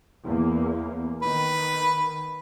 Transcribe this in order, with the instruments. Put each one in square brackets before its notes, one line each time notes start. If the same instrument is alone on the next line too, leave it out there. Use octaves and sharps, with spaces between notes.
[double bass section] E2 A#3
[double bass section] D#3 [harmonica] B4